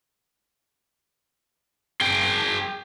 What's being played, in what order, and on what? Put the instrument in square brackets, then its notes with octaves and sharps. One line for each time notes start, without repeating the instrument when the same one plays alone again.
[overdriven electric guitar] G#4 G5